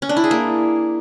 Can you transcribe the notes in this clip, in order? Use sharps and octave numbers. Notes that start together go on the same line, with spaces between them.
C#4
D4
E4
G#4
A#3